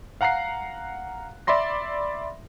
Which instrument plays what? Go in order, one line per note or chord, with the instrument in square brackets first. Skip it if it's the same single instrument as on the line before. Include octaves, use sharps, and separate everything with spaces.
[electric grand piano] F5 F#5 A#5 F#6 C7
D5 E5 B5 C6 A#6